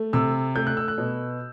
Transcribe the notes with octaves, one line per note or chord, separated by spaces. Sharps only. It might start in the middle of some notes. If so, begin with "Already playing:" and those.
Already playing: A3
C3 E6
A3 G6
F#6
E6
F#6
B2